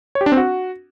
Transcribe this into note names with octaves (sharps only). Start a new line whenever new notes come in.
C#5
G4
D4
C4
F#4